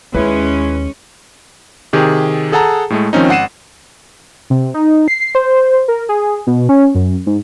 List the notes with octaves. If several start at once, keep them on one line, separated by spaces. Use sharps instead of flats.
D#2 G#3 C#4 E4 B4
C3 D#3 G4 G#4
G#4 A4 F#5 A5 A#5
A2 G#3 A3
D#3 F3 C4 C#4 D#4
G#1 F#5 C7 D#7 E7
C3
D#4
C7
C5
A#4
G#4
B2
C#4
F#2
G#2